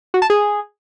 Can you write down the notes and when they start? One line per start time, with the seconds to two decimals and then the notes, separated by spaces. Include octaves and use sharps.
0.14 F#4
0.22 A5
0.30 G#4